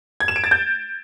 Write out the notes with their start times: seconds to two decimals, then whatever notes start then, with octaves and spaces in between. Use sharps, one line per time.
0.20 G#6
0.28 E7
0.36 D7
0.44 A6
0.51 G6